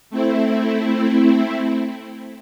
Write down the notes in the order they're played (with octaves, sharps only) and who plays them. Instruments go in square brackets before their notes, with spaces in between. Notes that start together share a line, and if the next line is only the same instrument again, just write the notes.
[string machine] A3 C4 E4